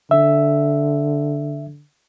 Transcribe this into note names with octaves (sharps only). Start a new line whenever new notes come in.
D3 E5